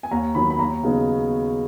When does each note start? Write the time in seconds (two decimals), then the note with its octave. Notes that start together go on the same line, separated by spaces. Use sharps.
0.03 G#5
0.11 D#2 A#5
0.35 D#3 F#3 B5
0.50 B5
0.59 D#2 A#5
0.83 C#3 F#3 B3 D#4